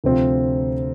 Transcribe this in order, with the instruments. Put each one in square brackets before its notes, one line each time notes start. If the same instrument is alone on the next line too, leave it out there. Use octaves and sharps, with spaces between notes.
[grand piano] D2 C3 F3 C4 F4